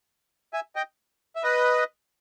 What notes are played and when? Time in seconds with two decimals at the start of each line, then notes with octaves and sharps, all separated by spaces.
0.53 E5 G#5
0.76 D#5 G5
1.36 E5
1.43 B4 D#5